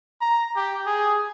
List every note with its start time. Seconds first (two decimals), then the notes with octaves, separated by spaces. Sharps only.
0.21 A#5
0.56 G4
0.87 G#4